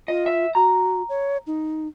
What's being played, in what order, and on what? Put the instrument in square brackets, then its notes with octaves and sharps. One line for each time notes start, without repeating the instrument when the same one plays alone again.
[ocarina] F4 [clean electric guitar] D#5
[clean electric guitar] E5
[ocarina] F#4 [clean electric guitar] A#5
[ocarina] C#5
D#4